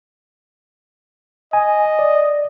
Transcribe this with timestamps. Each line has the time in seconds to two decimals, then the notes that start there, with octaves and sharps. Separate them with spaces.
1.53 D#5 G#5
1.99 D5